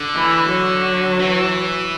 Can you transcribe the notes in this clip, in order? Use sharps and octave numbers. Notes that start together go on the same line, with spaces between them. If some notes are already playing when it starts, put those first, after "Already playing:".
Already playing: D3
E3
F#3
E3